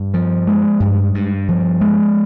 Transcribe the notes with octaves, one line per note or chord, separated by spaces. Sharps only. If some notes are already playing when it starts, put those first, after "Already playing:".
Already playing: G2
F3
G#3
G2
G2
F3
G#3